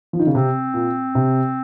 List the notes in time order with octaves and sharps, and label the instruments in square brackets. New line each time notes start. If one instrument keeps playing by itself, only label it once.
[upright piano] F3
D#3
C#3
[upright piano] C3 [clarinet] C4
[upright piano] A#2
C3